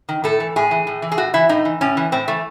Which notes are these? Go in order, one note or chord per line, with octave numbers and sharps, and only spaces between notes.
D#3
A2 A4
E3
A2 G#4
E3
A2
E3
G#4
A2 F#4
E3 E4
A2 D#4
E3
A2 C#4
E3
A2 C4
E3 A3